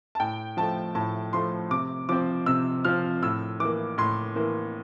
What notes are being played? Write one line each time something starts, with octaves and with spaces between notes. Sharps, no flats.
A5
A2 G5
F3 A3 A5
A2 A5
F3 A3 C6
C3 D6
F3 C4 D6
C3 E6
F3 C4 F6
A2 E6
E3 A#3 D6
A2 C6
E3 A#3